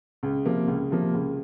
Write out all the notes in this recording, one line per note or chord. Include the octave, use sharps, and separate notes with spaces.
C#2
C3 F3 A#3
C#2
C3 F3 A#3
C#2